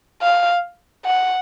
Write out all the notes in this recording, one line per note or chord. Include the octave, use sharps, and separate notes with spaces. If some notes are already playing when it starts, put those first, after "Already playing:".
F5
F#5